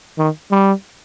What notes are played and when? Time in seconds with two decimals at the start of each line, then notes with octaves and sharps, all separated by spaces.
0.18 D#3
0.52 G3